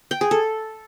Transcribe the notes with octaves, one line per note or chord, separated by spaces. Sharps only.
G5
G#4
A4